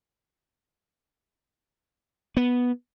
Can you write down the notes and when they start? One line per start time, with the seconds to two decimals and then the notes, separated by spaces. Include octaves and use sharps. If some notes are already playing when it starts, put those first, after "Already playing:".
2.37 B3